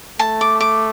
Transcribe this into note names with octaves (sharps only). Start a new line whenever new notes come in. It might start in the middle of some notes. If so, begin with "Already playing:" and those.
A3 A5
D6
D6